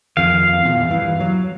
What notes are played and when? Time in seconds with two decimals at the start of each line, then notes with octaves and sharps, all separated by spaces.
0.17 F2 D#3 F5
0.65 E2 A#2
0.88 G2 E3
1.20 F#3